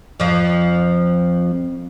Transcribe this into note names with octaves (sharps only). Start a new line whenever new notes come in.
F2 F3